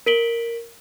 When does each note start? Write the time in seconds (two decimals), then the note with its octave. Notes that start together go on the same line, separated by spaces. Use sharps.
0.06 A#4 B6 D7 F#7 G7